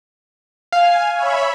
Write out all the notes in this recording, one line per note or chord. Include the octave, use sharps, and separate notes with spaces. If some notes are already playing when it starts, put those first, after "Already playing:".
F5 G#5
C#5 E5 B5